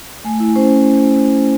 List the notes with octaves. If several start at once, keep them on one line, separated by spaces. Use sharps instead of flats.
A3 G#5
E4
C#4 C5